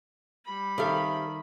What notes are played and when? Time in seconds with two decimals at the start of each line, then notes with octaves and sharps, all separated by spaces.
0.46 G3 B5
0.78 D#3 C4 G4 A4 E5 F5